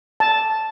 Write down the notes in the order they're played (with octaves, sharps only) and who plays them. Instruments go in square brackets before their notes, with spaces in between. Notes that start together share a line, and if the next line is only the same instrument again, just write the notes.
[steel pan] A5